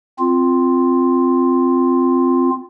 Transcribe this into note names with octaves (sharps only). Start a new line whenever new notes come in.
C4 F4